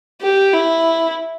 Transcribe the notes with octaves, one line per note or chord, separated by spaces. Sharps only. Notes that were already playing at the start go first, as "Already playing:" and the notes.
G4
E4